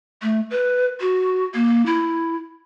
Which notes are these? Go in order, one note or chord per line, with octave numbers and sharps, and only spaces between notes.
A3
B4
F#4
A#3
E4